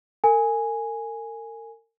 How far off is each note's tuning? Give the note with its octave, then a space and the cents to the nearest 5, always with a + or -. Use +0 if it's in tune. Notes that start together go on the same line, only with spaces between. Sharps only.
A#4 -40 G#5 +0